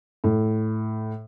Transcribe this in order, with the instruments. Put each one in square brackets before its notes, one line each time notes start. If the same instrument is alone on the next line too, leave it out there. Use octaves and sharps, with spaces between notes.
[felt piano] A2